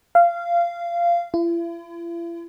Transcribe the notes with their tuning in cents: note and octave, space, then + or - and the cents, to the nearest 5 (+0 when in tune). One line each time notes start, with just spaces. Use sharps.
F5 -20
E4 +45